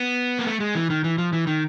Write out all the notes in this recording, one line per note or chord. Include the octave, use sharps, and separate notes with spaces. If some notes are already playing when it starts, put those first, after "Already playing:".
Already playing: B3
A#3
A3
G#3
E3
D#3
E3
F3
E3
D#3